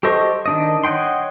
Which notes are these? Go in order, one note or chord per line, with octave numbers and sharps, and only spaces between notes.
G4 A4 C5 D#5 C#6
D#3 D4 D#5
C#5 D#5 F#5 G5 C6